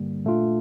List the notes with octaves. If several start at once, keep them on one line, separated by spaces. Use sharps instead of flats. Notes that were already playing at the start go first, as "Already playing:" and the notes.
Already playing: G2 D3 G3 A#3
A#2 A3 D4 F4